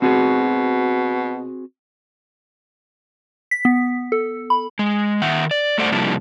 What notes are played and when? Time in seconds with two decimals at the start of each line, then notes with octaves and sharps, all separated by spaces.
0.02 B2 C4 F#4 G#4
3.51 B6
3.65 B3
4.12 A4
4.50 B5
4.79 G#3
5.22 D#3 E5 F#5
5.51 D5
5.78 G2 A3 A4 C5 D5 F#5
5.92 C3 F3 G3 A#3 D4 E4